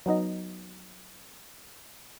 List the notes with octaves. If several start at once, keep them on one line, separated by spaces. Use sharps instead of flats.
F#3 B3 D#4 D#5